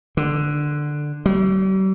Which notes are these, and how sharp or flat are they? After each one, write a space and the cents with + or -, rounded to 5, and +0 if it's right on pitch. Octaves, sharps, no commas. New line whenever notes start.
D3 +10
G3 -45